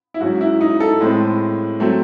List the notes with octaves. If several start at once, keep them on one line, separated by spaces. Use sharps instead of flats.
E4
G#2 F#3 C#4 F#4
E4
D#4
A4
A2 G#3 C4
F#3 A3 C4